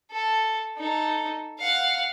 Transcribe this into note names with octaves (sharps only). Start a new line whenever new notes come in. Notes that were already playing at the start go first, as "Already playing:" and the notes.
A4
D#4 A4
F5 F#5